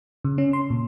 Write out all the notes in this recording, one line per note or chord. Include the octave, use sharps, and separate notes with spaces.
C#3
C#4
C6
A#2